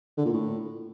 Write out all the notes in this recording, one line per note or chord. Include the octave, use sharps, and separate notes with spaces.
D3
A#2
A2